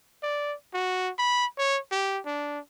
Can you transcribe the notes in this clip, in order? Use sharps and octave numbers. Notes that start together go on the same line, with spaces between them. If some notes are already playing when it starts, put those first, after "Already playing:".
D5
F#4
B5
C#5
G4
D4